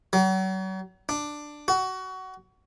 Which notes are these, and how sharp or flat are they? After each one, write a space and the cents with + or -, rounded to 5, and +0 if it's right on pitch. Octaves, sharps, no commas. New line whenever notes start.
F#3 +40
D4 +10
F#4 +20